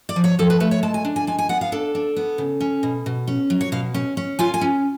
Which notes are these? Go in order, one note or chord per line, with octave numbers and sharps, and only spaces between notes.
D5
F3
C#5
F3 A4
B4
A3 B4
C#5
G#3 A5
G#5
D4
G#5
G#3 G#5
G#5
B3 F#5
F5
D4 A4
D4
B3
C#3
C#4
B2
B2
C#4
F#3
C#5
B2 F5
C#4
C#4
F4 G#5
G#5
C#4